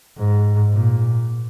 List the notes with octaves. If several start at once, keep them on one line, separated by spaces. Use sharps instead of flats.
G#2
A#2